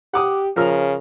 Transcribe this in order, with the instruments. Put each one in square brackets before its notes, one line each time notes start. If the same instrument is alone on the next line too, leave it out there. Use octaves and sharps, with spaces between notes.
[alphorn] G4 [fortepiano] F#5 D6 D#6
[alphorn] C#3 [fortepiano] F3 A#4 F6